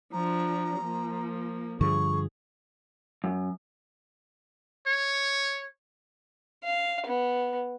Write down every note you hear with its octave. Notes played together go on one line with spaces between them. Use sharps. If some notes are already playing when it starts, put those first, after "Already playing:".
F3 D4 A#5
F3 A#3
G2 D3 F3 G#4 C#6
F#2
C#5
F5
B3